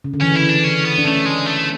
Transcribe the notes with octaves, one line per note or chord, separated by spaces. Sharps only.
C#3
D3
E3 C#4
E4
D4
C#4
B3
D4
A3 C#4
G#3
A3